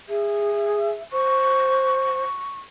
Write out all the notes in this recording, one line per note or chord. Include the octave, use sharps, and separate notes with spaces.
G#4 E5
C5 C#6